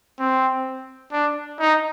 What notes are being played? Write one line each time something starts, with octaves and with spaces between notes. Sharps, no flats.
C4
D4
D#4